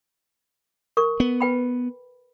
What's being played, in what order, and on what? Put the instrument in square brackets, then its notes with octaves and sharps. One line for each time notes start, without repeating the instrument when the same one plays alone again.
[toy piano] A#4 C#6
[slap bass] B3
[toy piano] B4 G5 B5